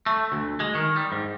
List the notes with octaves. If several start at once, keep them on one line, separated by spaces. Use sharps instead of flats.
A3
D2
G#3
D#3
G3
G#2